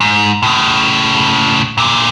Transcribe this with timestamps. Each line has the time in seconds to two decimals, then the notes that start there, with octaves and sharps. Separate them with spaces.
0.01 G#2
0.42 A2 C#3
1.78 A#2 D3